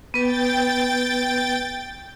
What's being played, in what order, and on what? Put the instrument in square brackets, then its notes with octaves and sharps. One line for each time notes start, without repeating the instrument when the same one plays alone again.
[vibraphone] B3 B4 [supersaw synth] G5 A6